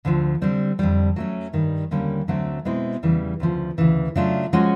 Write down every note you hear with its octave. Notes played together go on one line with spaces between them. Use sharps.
D2 D3 F3
D3 G3 C4
F2 D3 G3
F#3 A3 C#4
G2 D#3 G3
D#2 D3 G3 A#3 C#4
D2 D3 F#3 A3 C4
B2 G#3 C4 E4
E2 C#3 E3 G3
D2 C#3 F3
D2 C#3 E3
C#3 F#3 A3 D4 F4
F3 G#3 C#4 F#4